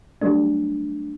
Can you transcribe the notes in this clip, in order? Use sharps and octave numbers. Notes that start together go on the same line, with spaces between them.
F#3 G3 A3 D4